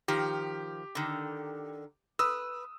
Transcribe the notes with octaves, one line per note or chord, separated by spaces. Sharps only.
D#3 F3 G4
D3 D#3
B4 D#6 E6